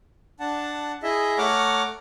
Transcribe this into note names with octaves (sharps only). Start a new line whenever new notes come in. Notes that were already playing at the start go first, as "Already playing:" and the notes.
D4 F#5 A5
E4 G#4 D#5 E5
A3 C#5 F#5 A#5 D6 F6